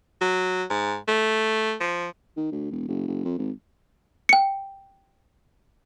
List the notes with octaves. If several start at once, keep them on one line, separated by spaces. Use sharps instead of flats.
F#3
G#2
A3
F3
D#3
D2
E1
F#1
F#1
F2
G#1
G5 C#7